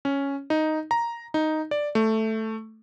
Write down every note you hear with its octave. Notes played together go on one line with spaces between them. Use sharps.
C#4
D#4
A#5
D#4
D5
A3